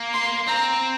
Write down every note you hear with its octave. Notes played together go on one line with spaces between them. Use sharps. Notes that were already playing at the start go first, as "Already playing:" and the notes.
Already playing: A#3
C6
C4 A#5